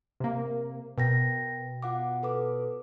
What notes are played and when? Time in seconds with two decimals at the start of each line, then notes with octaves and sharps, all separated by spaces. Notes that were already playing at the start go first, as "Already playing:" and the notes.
0.20 C3 A#3
0.98 B2 A#4 G5 A#6
1.83 F4 F#5 D6
2.23 A4 B4 D6